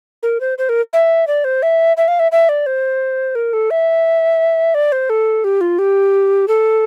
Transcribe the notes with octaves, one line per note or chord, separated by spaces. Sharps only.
A#4
C5
C5
A#4
E5
D5
C5
E5
E5
F5
E5
E5
D5
C5
A#4
A4
E5
D5
C5
A4
G4
F4
G4
A4